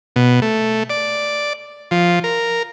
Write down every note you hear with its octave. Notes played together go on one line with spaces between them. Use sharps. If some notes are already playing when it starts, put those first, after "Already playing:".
B2
A3
D5
F3
A#4